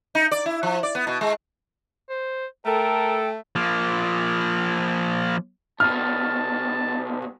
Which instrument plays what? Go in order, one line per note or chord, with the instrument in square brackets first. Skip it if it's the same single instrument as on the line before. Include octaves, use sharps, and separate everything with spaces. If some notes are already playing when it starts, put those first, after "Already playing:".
[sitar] D#4
D5
E4
F3
D5
B3
B2
G#3
[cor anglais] C5
[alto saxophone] A3 [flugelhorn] A4 [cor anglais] A#4 [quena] G5
[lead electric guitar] F3 A#3
[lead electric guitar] C2 B2 [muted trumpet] A5 [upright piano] F6